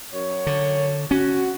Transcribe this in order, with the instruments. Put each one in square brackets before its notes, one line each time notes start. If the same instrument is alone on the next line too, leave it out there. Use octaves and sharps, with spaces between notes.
[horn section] F#2 C#5
[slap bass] D3
[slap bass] C#4 [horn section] F#4